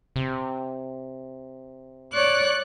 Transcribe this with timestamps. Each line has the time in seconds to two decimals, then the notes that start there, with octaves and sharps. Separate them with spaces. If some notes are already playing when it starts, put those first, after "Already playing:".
0.16 C3
2.13 C#5 D5 F#6